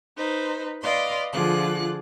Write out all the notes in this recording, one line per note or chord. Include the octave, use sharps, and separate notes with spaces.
D#4 B4 C5
B4 D5 D#5 F5 C6
D3 F3 F4 G#4 D6 F#6